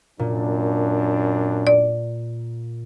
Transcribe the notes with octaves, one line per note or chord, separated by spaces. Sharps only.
F#2 A#2 D4
D5